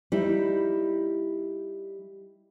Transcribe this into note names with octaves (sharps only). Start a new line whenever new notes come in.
G3 D#4 E4